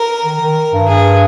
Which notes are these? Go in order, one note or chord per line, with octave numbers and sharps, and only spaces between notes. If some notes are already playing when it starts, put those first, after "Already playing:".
Already playing: A#4
D#3
D#3
G2
G2 G#4